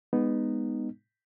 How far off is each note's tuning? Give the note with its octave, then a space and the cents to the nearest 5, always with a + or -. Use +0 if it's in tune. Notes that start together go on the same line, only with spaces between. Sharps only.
G#3 -20 B3 +0 D#4 -15